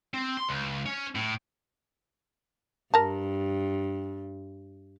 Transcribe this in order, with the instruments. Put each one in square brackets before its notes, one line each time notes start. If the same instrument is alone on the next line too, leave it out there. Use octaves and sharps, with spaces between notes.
[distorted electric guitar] C4
C6
C#2
C#4
A2
[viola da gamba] G2 [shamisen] A#4 A5